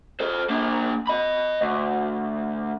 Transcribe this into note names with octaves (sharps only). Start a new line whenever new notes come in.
A4 C5
A#3 D4
D#5 B5
D2